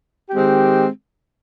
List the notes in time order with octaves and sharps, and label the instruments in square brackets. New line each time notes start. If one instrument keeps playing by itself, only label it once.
[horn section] D#3 G#3 C4 G4